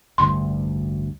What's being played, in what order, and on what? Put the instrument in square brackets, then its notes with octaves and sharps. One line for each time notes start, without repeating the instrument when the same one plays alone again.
[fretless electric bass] A1 D2 G2 [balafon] C6